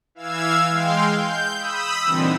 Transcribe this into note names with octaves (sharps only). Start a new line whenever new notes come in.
E3 F5 E6 G#6
G#3 F5 G5 C6
G6
B5 D#6 E6
A#2 D3 E3 G3 C4 D#4